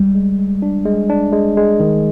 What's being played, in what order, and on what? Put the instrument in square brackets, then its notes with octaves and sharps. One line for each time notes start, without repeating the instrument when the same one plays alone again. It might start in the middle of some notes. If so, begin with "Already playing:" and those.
Already playing: [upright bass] G3 [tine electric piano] G#3
[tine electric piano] G#3
G#3
D4
G#3
D4
G#3
G#3
D#3